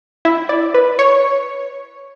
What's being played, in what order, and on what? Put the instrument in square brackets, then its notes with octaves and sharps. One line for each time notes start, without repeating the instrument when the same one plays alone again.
[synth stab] E4
D5
B4
C#5